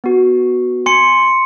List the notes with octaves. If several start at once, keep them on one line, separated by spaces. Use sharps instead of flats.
B3 F#4
G#5 C6 C#7